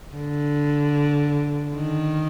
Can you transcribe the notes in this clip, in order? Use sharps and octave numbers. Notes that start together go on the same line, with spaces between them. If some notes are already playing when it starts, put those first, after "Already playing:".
D3
D#3